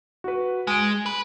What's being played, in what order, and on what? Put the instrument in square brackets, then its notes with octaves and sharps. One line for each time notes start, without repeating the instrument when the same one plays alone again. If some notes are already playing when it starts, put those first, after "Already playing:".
[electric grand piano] F#4 B4
[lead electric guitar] G#3 [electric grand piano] G#5 D7
[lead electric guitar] B4